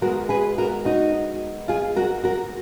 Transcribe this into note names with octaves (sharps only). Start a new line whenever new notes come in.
D#3 G#3 B3 F#4 A#4
G#4 B4
F#4 A#4
D#4 F#4
F4 G#4
F#4 A#4
F#4 A#4